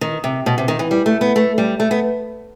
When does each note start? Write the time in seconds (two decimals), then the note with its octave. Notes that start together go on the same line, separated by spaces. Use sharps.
0.01 D#3
0.24 C3
0.46 B2
0.58 C3
0.68 D#3
0.79 E3
0.91 G3
1.06 A3
1.21 B3
1.36 A3
1.58 G3
1.80 A3
1.91 B3